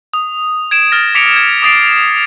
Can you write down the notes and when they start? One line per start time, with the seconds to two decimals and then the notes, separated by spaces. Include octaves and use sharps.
0.14 D#6
0.71 G#6 D7 E7
0.92 F6 A6 A#6
1.15 D6 B6 C#7 D7 F7
1.36 G#6
1.62 D6 D#6 A6 C7 D7